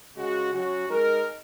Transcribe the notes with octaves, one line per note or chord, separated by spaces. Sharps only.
C#3 G#3 F#4
F#3 C#4 F#4
G#3 D#4 A#4